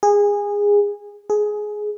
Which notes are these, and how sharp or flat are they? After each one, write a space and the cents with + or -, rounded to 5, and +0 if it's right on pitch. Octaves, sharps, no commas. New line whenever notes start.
G#4 -20
G#4 +15